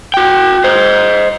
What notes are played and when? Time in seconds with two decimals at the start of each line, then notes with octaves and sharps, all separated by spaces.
0.14 F#4 G5
0.64 C5 D#5